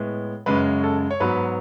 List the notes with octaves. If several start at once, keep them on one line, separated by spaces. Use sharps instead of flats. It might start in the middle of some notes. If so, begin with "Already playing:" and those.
Already playing: A2 G#3 B3
F#2 C#3 G#3 B4
A4
C#5
G#2 F#3 B3 B4